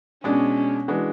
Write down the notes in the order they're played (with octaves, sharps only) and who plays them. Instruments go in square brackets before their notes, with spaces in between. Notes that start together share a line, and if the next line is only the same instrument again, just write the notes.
[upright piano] B2 G#3 D4 [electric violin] C#4
[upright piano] E3 G#3 D4 F#4